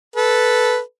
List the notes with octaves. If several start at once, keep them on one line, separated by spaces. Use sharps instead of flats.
A4 B4